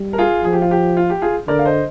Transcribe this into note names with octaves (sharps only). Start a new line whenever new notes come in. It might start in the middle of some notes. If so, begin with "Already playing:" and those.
Already playing: G3
A#4
F4 G#4
F3 G#4
G4
F4
G4
F4
G4
F4 G#4
D3 A#4 D5
F5
C5 D#5